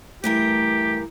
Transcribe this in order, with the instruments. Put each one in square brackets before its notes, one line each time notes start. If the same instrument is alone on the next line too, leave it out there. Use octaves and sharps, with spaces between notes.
[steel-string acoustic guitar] G2 E3 A#4 [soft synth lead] A3 [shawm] G4